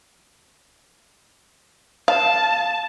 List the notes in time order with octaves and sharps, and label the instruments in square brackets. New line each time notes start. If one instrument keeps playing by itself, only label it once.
[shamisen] F5 [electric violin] A5